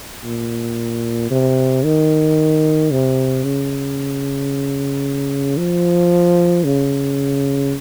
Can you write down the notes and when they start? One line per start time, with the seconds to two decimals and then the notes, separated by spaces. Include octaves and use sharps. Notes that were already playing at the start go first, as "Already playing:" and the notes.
0.24 A#2
1.30 C3
1.84 D#3
2.91 C3
3.44 C#3
5.57 F3
6.64 C#3